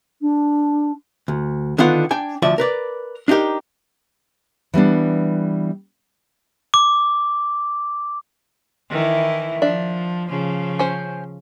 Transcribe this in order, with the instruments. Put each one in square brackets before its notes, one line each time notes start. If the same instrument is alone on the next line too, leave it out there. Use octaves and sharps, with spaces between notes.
[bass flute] D4
[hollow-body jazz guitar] D2
D3 D#3 B3 F4 F#5
D4 G5 G#5
D2 F3 D5 E5
A#4 B4 D5
D4 D#4 F#4 G4 A#4
[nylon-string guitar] E3 G3 B3 D4
[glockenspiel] D6
[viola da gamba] D#3 E3 E4
[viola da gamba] F3 [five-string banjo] D4 E5
[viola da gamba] C#3 F3
[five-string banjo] C#4 C5